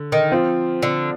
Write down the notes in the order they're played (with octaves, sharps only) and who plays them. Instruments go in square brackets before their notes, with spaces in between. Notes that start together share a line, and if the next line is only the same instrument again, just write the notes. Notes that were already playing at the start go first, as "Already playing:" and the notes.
Already playing: [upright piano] D3
[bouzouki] D#3
[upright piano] F3 C4 F4
[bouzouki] D3